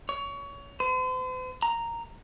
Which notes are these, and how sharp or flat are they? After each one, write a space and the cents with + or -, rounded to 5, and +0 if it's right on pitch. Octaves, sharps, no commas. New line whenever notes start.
C#5 +25
C5 -45
A#5 -5